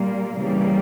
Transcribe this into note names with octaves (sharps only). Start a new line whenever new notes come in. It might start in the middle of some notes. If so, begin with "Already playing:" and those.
Already playing: A#2 G3 A#3
C#3 E3 G3 A#3